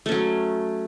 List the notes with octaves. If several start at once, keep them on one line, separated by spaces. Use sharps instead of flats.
F#3 A3 C#4